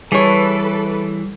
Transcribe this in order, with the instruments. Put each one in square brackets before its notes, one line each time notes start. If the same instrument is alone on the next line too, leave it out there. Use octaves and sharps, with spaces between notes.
[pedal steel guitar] E3 [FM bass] G3 [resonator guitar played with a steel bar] G#4 C#5 [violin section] A4 B4